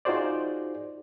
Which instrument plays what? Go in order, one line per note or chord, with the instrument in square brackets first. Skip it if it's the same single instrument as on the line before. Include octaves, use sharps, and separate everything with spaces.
[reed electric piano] D#4 F4 F#4 G#4 C5 D5